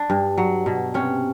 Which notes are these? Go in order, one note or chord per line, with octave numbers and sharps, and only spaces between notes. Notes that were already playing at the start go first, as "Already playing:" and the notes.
Already playing: D4
G2
F#3
B2
C3 C#4